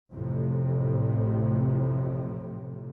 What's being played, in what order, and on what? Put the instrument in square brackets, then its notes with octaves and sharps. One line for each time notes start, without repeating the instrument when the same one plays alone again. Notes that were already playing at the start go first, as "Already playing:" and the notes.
[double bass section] A1 F2 A2 C3